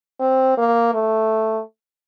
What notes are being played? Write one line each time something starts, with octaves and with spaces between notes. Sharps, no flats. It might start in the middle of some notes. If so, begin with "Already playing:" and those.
C4
A#3
A3